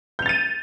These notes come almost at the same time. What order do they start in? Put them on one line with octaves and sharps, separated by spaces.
G6 F7 A6 D#7